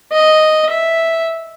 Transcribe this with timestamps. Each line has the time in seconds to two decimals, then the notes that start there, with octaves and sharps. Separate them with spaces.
0.12 D#5
0.70 E5